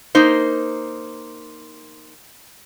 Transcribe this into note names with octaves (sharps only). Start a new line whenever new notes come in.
A#3 D#4 C5